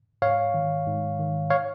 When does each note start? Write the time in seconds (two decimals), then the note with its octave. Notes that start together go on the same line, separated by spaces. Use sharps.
0.22 G#2 C#5 F5
0.54 D#3
0.86 G#2
1.19 D#3
1.50 C#5 F5